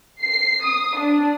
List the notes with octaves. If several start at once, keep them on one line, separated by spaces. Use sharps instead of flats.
C7
D#6
D4